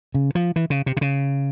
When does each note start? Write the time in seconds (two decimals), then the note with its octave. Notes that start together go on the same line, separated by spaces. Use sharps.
0.15 C#3
0.35 F3
0.56 E3
0.70 C#3
0.86 C3
0.97 C3
1.01 C#3